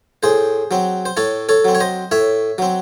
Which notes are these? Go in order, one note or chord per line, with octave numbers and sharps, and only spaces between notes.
A2 G#4 C5
F#3 C4
C5
A2 A4 C#5
A4 C#5
F#3 C4
C#5
C5 D#5
A2 C#5 E5
F#3 C4